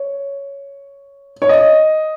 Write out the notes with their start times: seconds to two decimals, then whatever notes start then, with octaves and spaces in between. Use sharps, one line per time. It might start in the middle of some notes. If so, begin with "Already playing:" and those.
Already playing: C#5
1.42 C#5
1.49 D#5